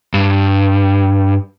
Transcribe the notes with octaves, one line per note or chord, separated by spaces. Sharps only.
G2